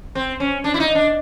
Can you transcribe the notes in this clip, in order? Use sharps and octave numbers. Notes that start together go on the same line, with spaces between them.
C4
C#4
D4
E4
D#4
D4